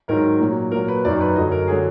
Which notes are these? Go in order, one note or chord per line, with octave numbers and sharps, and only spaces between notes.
G#2 D#3 F#3 A#4
A#2 F#3
A#2 F#3 A#4
B4
F#2 D#3 F#3 D5
B4
F#2 D3 F#3 D#5
A#4
G#4
D3 F#3